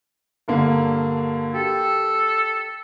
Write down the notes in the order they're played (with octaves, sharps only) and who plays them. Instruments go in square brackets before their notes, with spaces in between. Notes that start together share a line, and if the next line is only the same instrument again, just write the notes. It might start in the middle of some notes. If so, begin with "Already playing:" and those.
[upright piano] G2 D3 A#3
[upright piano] G4 [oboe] A4